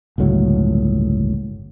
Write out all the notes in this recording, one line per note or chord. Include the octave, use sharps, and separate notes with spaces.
G1 C#2 A2 F#3